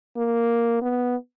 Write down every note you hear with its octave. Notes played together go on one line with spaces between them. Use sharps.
A#3
B3